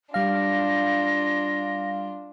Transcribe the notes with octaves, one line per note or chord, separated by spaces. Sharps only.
G3 D4 F4 F5 A#6